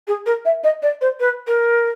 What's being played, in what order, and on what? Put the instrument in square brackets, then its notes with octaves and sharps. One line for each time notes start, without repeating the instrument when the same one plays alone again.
[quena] G#4
A#4
E5
D#5
D5
C5
B4
A#4